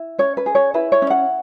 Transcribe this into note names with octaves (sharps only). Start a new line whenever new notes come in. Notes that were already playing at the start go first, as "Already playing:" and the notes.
Already playing: E4
C#4 C#5
B4
G#4
C#5
E4 B4
C#5
C#4
F#5